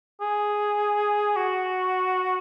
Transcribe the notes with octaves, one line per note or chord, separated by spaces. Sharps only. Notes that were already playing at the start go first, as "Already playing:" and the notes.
G#4
F#4